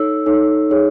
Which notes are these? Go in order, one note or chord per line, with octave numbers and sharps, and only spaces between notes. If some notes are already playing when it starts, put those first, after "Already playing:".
Already playing: D#4 A4 C#5 E6
D#4 A4 C#5
D#4 G#4 C#5